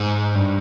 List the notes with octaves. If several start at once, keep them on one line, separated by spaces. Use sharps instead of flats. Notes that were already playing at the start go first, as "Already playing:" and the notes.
Already playing: G#2
G2